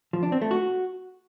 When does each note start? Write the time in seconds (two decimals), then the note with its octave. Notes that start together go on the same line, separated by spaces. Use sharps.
0.13 F3
0.23 D4
0.32 C4
0.41 A3
0.51 F#4